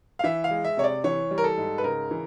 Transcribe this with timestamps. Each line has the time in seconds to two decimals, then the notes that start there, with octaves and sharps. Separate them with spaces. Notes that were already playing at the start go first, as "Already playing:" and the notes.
0.19 F5
0.24 E3 E5
0.44 F5
0.51 G#3
0.65 E5
0.77 C3 C#5
0.84 D5
1.04 E3 C#5
1.31 G3
1.38 A#4
1.44 A4
1.57 G#2
1.78 B4
1.84 C#3 A#4
2.11 E3